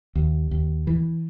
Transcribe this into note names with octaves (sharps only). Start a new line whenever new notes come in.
D#2
D#2
E3